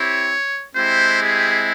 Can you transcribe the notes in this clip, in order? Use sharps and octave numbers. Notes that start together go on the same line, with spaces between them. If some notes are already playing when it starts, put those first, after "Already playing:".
Already playing: C4 E4 G4 C#5
G#3 C4 E4 G4 C5
G#4